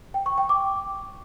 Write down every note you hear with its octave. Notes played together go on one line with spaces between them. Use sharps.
G5
C#6
G5
D6